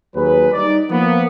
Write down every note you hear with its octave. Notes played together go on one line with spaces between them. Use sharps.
D#2 F#3 G#4 B4
G3 D#4 D5
F3 A#3 B3